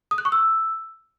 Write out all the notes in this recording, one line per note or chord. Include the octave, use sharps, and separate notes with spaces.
D#6
F#6
C#6
E6